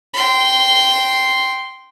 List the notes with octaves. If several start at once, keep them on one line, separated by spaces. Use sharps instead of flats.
G5 C6